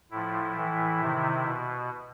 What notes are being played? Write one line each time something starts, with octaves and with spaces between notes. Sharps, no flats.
A2 F3 E4
A2 E3
C3 D#3
B2